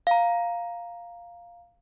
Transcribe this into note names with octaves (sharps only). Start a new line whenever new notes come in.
F5 A#5